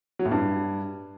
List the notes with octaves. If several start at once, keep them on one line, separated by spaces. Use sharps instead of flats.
F#3
A2
G2